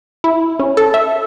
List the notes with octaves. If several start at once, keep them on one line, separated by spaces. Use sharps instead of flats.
E4
C#4
A4
E5